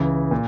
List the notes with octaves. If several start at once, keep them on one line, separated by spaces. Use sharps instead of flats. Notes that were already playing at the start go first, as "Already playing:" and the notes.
Already playing: C#2 C#3 E3
A#2